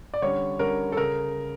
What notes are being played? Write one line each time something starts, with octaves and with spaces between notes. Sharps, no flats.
D5
D3 G3 C#4 C#5
D3 G3 C#4 A#4
A4
C#3 A#4